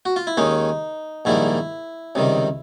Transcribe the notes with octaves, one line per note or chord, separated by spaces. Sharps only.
F#4
F4
E4
D#2 D#3 G#3 C#4 D#4
A#1 G#2 D#3 G3 A#3 E4
C#2 C3 D#3 G3